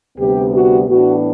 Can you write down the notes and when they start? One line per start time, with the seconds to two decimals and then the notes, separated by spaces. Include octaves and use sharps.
0.18 D2 C3 G3 B3 G4
0.53 F#4
0.88 A2 E3 B3 D4 F#4